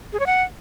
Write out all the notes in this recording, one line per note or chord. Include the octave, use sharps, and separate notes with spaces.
G#4
C#5
F#5